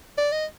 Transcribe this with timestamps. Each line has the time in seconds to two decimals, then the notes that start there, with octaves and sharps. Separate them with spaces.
0.18 D5
0.32 D#5